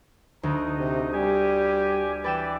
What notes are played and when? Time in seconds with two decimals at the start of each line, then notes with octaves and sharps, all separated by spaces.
0.43 D2 D#4
0.78 C3
1.13 G3 G4 G#5
2.24 E3 B4 D5 G5 E7